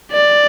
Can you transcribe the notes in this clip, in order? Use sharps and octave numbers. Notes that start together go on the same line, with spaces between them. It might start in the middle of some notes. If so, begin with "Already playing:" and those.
D5